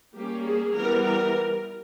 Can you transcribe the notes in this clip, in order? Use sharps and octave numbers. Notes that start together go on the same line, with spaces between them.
G3 A#3 C#4 G4
G#4
E3 G3 B3 A#4
A#4